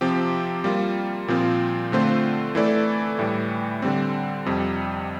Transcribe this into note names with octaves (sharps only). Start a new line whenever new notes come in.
C3 F3 C4 G4
G3 A#3 F4
A#2 F3 C4 F4
D3 A3 C4 F4 C5
E3 A3 E4 A4 D5
A2 E3 G3
D3 G3 C4
F2 C3 G3